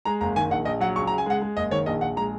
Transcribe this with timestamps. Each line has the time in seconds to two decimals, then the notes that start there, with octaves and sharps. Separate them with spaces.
0.05 G#3 A#5
0.21 F#1 A#5
0.36 D#3 G#5
0.50 A#1 F#5
0.65 A#1 D#5
0.80 F#3 F#5
0.96 C#2 C#6
1.07 A#5
1.12 C#2
1.18 G#5
1.26 G#3 F#5
1.42 G#3
1.56 F#1 D#5
1.71 D#3 C#5
1.86 A#1 D#5
2.01 A#1 F#5
2.16 G#3 A#5